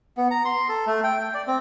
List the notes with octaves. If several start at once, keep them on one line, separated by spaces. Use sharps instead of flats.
B3
A#5
C6
A4
A3
G5
G5
D5
C4